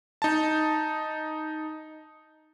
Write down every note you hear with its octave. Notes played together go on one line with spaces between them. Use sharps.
D#4 A5